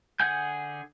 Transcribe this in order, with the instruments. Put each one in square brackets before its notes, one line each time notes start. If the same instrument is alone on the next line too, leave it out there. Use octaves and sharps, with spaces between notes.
[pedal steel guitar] D3 G#4 F#5 G#5 G6